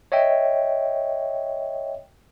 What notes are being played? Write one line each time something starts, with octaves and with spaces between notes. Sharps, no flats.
C#5 D#5 E5 G5